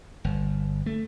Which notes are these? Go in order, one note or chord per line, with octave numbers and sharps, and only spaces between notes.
G1
A3